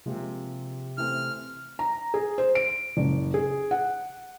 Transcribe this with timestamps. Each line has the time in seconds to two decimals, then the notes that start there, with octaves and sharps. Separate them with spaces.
0.06 C3 F3 G#3 A#3
0.98 E3 A3 C4 F6
1.79 A#5
2.14 G#4
2.38 C5
2.55 D7
2.97 F#1
3.34 G#4
3.71 F#5